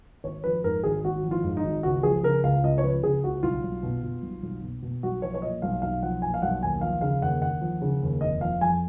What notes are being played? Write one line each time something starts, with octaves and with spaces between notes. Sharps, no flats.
G#1 C#5
F3 B4
G#2 A#4
G#1 G#4
G#1 F#4
F3
F4
G#2
D#4
G#1
C#2 F#4
F3 G#4
C#3 A#4
C#2 F5
C#2 D#5
C#5
F3 B4
C#3 G#4
C#2 F#4
B1 F4
B1
B2
B2
B1
B1
B2
B2
B1 F#4
F3 C#5
C#5
A#2 D#5
B1 F5
B1 F5
F3 F#5
A#2 G#5
F5
B1 F#5
D#2 G#5
F3 F5
C#3 F5
D#2 F#5
D#2 F#5
F3
C#3
D#2
F1 D#5
F3 F5
F2 G#5